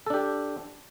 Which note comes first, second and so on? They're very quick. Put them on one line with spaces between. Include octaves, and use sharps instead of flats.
A4 D4 G4